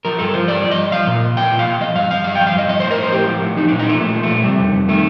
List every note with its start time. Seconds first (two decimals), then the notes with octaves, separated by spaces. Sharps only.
0.05 F3 A#4
0.19 G2 A4
0.34 F3 C5
0.48 G2 D5
0.64 F3
0.71 D#5
0.78 G2
0.92 F3 F5
1.07 A#2
1.22 F3
1.37 A#2 G5
1.51 F3
1.59 F5
1.67 A#2
1.81 F3 D#5
1.95 G2 F5
2.11 F3 F5
2.24 G2 F5
2.35 F3 G5
2.47 F5
2.55 G2 D#5
2.69 F3 D#5
2.80 A2 C5
2.91 A#4
2.98 F3 C5
3.12 A2 G4
3.27 F3
3.41 A2
3.57 F3 D#4
3.68 A#2 D4
3.79 D#4
3.86 F3 A3
4.00 A#2 A3
4.15 F3
4.23 A3
4.30 A#2
4.44 C3 G3
4.59 F2
4.74 F2
4.89 D#3 A3